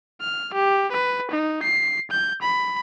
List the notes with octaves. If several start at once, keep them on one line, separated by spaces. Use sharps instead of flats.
F6
G4
B4
D#4
C7
G6
B5